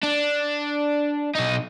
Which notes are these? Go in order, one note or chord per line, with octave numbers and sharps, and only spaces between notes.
D4
B2 D#4